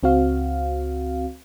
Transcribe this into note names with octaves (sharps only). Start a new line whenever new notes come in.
C#2 C4 F#4 F5